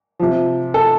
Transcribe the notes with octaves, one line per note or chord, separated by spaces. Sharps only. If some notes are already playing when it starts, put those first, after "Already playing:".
C3 F3
A4